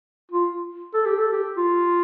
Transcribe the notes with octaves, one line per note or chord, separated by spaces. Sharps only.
F4
A4
G4
A4
G4
F4